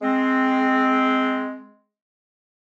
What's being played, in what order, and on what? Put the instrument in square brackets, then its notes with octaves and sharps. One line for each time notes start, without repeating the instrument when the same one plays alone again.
[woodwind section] G#3 C4